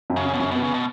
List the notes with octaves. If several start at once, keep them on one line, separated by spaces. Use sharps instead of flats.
F#2
C#3
C#4
B2
F#2 C#3
B2 B3
C#3
B2